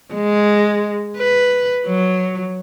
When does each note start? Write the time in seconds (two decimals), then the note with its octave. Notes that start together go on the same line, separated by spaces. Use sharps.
0.14 G#3
1.18 B4
1.87 F#3